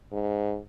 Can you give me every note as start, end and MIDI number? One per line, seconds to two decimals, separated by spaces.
0.12 0.59 44